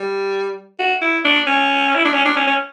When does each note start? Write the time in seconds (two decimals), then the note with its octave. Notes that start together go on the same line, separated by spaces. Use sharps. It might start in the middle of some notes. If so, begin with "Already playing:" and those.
Already playing: G3
0.79 F#4
1.02 E4
1.24 D4
1.47 C#4
1.95 E4
2.05 D4
2.14 C#4
2.25 D4
2.36 C#4
2.47 C#4